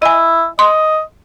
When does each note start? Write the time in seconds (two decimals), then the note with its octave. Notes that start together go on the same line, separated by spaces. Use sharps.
0.02 E4 D#5 G#5
0.59 D#5 C6